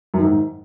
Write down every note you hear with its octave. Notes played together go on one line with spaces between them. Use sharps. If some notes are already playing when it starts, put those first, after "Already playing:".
F#2
D#3
G#2